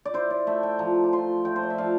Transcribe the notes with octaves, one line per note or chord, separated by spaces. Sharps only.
D5
E4 C5
D5
A3 E5
G5
F3 A#5
D6
F3 C6
A3 G5
C5
D5
E5
F3 F5